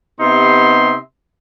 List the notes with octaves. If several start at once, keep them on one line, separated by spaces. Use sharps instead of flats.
C3 B3 D#4 G4 E5 C6